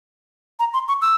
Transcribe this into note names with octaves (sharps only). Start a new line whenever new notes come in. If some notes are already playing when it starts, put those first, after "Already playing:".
A#5
C6
C#6
E6